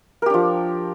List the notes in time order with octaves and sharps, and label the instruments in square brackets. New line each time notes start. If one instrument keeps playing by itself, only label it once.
[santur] A#4
G4
D4
F3